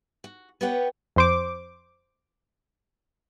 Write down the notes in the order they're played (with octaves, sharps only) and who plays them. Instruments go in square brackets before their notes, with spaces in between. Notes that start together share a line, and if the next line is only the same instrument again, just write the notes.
[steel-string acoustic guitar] F#4
B3 G4 B4 C#5 F#5 G5
[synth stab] F2 C5 D6